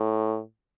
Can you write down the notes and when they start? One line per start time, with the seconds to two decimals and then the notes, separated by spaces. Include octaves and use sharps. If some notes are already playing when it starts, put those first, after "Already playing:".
Already playing: A2